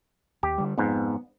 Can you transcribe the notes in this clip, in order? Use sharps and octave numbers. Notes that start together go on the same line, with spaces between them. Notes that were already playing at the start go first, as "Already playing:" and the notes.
D#2 G4
D3 G3
F2 G#2 B3